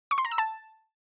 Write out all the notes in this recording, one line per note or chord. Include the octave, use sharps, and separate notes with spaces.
C#6
C6
A#5
E6
A5